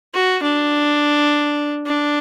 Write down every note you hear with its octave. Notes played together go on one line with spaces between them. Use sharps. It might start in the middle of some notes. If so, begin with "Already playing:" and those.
F#4
D4
D4